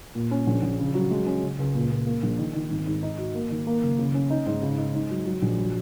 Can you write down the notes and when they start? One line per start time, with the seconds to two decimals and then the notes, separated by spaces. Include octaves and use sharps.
0.15 A#2
0.31 C#4
0.47 A#1
0.62 A#1
0.79 C#3
0.94 F#3
1.11 G#3
1.26 C#4
1.42 C#3
1.58 C#2
1.74 A#2
1.91 A#2
2.06 A#3
2.23 A#1
2.38 D#3
2.54 D#3
2.70 G#1
2.87 G#2
3.03 D#4
3.18 F#4
3.34 A#3
3.50 D#3
3.67 A#3
3.82 F#1
3.98 C#3
4.14 C#4
4.30 D#4
4.46 G#2
4.62 C#3
4.78 D#4
4.95 G#2
5.10 F#3
5.26 F#3
5.42 A#1
5.58 F#3